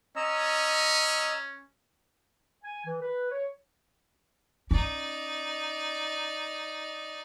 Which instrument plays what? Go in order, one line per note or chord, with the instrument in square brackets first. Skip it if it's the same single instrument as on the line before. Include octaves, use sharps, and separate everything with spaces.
[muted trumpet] C#4 [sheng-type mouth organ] D#5 A#5 E6
[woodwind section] G#5
E3
B4
C#5
[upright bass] C#4 [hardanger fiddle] D#4 D5